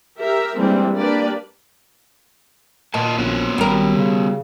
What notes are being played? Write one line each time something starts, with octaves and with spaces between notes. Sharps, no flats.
G4 A#4 E5
E3 G3 G#3 A#3 C4 D4
A#3 D4 G4 B4 D5
A#2 A#3 D#5 A5
A#1 B3 C#4 F#4
G#1 G3 A#4
C#3